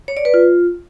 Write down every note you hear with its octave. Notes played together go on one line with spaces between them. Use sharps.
C#5
D5
B4
F4